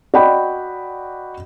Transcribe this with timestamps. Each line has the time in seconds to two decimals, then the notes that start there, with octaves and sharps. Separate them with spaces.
0.14 F#4 D5 D#5 G5 B5